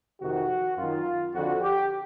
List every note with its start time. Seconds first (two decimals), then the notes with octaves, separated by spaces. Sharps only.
0.21 F2 C3 D#3 F#4
0.78 F#2 D#3 F4
1.34 F2 D3 F#4
1.61 G4